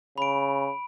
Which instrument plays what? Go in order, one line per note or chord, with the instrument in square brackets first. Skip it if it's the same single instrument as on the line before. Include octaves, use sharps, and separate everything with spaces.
[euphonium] C#3 [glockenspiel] B5 D7